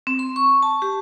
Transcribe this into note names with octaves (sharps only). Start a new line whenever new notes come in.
C4
C6
C#6
A5
G4